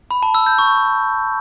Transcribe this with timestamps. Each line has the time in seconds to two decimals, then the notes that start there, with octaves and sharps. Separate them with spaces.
0.11 B5
0.23 A5
0.35 E6
0.47 G6
0.59 C#6